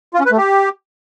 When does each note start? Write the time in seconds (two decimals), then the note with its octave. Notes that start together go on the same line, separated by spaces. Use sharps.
0.14 F4
0.20 C#4
0.26 B4
0.31 A3
0.37 G4